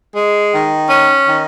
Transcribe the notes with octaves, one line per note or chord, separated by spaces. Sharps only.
G#3
D#3
C#4
D#3